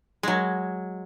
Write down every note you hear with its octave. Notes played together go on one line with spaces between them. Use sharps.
F#3 G#3